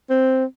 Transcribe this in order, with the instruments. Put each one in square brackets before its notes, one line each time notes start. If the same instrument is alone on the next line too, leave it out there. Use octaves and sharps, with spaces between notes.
[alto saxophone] C4